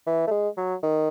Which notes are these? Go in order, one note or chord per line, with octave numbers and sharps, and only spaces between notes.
E3
A3
G#3
F#3
D#3